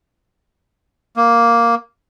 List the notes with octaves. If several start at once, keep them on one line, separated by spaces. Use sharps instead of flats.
A#3